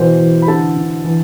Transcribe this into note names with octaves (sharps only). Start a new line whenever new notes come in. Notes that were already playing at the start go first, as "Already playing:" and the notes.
Already playing: B2 E3 C5
E3
B5
D3 A4 A5
D3
E3